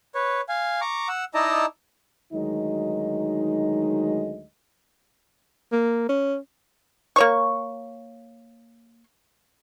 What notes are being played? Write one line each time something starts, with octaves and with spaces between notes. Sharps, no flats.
B4 C#5
F5 G#5
A#5 C#6 D6
F#5 E6
D#4 E4 D5 D#5 A5 A#5
D2 D#3 F#3 G#3 D#4 D#5
A#3
C#4
A#3 C#5 C#6